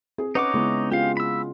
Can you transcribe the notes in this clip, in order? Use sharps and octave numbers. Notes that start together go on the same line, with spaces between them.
C4 G#4
C#4 D#4 B4 C#5 D#5 F#5 D6
C#3 G#3 B3 E4
C#4 F4 G4 G#4 F5
B5 E6